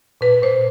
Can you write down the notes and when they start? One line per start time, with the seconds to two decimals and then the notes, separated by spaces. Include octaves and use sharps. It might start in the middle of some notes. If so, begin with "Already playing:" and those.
0.21 A#2 B4
0.42 A#2 C5